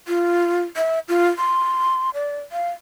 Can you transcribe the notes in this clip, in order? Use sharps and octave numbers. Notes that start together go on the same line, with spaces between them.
F4
E5
F4
C6
D5
F5